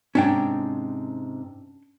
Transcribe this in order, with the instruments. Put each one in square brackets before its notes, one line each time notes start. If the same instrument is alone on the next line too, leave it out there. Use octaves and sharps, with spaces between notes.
[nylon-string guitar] G#2 C3 [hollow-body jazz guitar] C#4 D4 G5